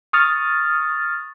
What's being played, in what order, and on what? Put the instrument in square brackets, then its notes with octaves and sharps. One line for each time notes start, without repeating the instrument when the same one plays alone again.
[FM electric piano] C#6 D#6 F6 A6